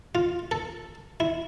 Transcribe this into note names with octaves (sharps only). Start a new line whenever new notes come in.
F4
A4
E4